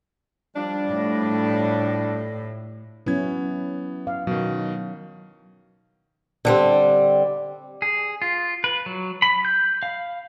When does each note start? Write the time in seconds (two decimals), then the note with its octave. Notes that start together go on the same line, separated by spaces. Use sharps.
0.56 F3 G3 D4
0.89 A2
3.06 F#3 B3 C#4 E4 G#6
4.07 F5
4.27 B2 D#3 F#3
6.45 D3 G3 C4
7.82 G#4
8.22 F4
8.64 B4
8.86 F#3
9.22 B5
9.45 G6
9.83 F5